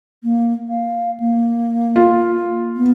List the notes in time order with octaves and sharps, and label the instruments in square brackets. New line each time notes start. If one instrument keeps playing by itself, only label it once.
[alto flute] A#3
F5
A#3
[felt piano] F4
[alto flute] B3